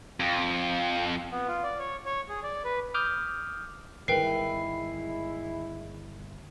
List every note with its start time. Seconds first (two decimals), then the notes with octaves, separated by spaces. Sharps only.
0.20 F2
1.32 B3
1.48 F4
1.63 D5
1.79 C#5
2.05 C#5
2.29 G#4
2.43 D5
2.65 B4
2.94 D6 D#6 F6 G6
4.08 G1 D#3 G#3 E4 A#4 B4 G5 C7